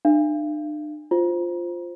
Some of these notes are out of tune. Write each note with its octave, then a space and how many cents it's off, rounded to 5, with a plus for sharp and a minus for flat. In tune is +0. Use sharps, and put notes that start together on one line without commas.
D4 +40 F5 -40
F4 +0 C5 +0